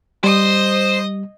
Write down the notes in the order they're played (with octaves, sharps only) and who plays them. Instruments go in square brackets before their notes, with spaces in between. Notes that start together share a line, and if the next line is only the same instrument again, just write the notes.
[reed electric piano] G3 [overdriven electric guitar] C5 [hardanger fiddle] D#5 D#6